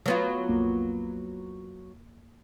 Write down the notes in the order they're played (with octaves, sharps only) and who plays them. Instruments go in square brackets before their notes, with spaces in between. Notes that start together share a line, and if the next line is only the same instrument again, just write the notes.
[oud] F#3 B3 F4
[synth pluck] B1 F2 A#3